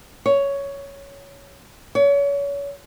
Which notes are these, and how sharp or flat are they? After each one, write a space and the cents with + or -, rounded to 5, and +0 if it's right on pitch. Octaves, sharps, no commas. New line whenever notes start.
C#5 +10
C#5 +35